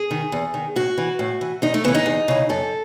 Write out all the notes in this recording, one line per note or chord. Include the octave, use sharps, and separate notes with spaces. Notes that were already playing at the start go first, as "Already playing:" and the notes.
Already playing: G#4
D#3
E2
D#3
A2 F#4
E3
A2
E3
E2 D#4
A3
C#3 E3 B3
D#4
E2
C#3 E3
F#2 A4